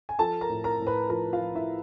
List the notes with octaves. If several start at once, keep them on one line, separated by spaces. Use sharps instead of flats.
G#5
F3 A4 A5
A#4 A#5
A2
A#4 A#5
A2
B4 B5
F3 A#4 A#5
F4 F5
F3
E4 E5